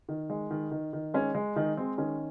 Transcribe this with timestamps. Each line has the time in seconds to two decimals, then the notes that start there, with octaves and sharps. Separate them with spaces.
0.09 D#3
0.30 G#3
0.50 D#3
0.71 D#3
0.93 D#3
1.14 G#3 C#4
1.35 G#3
1.56 D#3 G#3 D#4
1.77 G#3 C4
1.98 D#3 C#4